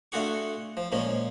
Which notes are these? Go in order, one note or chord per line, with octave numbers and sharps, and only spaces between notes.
D3 A3 F4 F#4 G#4 C#6
F3
A#2 F3 G#3 C#4